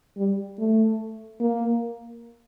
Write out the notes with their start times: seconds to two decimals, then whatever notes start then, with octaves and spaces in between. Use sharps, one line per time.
0.17 G3
0.59 A3
1.40 A#3